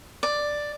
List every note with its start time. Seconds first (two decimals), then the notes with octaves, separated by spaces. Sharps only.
0.23 D5